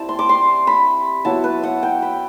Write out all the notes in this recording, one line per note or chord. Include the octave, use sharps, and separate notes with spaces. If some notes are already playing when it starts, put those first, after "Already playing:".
Already playing: G3 C4 E4 G5 A5
C6
D6
C6
B5
F#3 B3 E4 A5
B4
F#5
G5
B5